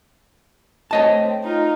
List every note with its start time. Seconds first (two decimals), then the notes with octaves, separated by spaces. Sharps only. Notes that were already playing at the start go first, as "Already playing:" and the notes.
0.91 A3 C4 C#5 D#5 A5
1.43 D#4 F4